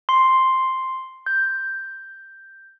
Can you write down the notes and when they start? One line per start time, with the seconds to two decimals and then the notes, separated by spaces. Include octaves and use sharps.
0.09 C6
1.26 G6